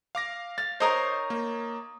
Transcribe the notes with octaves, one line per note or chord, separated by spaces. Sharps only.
F5 D6 A#6
F5 A6
D#4 A#4 C5 C#5 D#6
A#3